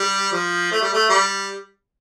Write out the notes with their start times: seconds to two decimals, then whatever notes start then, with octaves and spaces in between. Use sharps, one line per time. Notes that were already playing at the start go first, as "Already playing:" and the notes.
Already playing: G3
0.32 F3
0.72 A3
0.81 G3
0.93 A3
1.09 G3